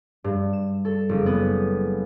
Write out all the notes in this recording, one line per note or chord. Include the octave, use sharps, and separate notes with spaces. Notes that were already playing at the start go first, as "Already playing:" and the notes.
G2
E7
A4
F#1
B3